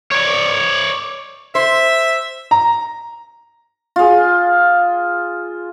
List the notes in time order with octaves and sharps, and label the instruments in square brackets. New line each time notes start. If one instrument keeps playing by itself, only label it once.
[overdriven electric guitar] C#5 D5
[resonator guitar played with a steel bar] C5 [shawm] E5
[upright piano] A#5
[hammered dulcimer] F4 G#4